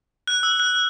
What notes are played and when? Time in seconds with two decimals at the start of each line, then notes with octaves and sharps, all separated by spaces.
0.28 F#6
0.43 E6
0.60 F#6